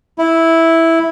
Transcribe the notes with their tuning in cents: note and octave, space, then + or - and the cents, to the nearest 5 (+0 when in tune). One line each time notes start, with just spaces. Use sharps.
E4 -5